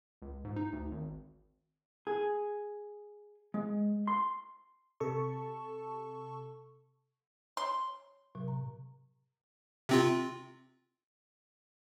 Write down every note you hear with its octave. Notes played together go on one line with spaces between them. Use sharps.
C#2
G#2
D#4
D2
G#1
G#4
G#3
C6
C3 A4 A5 C#6
C#5 C6
A2 C3 F#3
G#2 A#5
C3 C4 F4